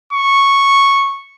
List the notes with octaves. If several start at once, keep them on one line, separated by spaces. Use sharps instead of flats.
C#6